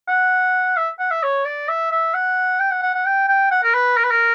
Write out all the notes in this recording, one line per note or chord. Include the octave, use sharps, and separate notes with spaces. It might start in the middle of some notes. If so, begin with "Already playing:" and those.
F#5
E5
F#5
E5
C#5
D5
E5
E5
F#5
G5
F#5
F#5
F#5
G5
G5
F#5
A#4
B4
A#4
B4
A#4